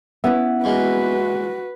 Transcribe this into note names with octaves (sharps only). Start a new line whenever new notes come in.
B3 C#4 E4 E5 F#5
E2 G#3 A#3 F#4 B4